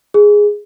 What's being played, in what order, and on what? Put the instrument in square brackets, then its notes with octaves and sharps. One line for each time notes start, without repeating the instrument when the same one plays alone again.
[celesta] G#4